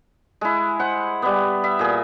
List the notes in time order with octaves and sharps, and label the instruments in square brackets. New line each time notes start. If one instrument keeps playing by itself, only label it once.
[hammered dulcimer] G#3 E4
C5 F#5
G3 B3
E5
A#2 G#4